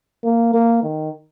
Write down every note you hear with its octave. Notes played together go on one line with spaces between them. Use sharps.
A#3
A#3
D#3